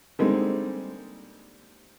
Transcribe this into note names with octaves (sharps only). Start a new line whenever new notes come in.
D3 G3 G#3 A#3 C4 D#4